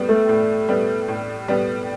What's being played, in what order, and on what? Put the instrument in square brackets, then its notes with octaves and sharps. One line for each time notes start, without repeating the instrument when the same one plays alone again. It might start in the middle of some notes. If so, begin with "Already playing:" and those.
Already playing: [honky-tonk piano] A2 G3 B3
[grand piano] A3
[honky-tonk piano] A2
G3 B3
A2
G3 B3